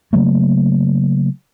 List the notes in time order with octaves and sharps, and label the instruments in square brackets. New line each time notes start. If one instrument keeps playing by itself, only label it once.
[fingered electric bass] C#3 F#3 A3 A#3